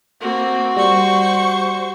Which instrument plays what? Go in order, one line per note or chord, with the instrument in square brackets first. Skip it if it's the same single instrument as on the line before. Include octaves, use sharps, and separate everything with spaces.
[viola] A#3 C4 [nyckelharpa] F#4
[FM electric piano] G3 [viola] C5 C#6